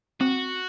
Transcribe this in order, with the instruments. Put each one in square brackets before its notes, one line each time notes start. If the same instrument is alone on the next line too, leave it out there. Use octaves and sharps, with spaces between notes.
[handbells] C4 [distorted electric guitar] F#4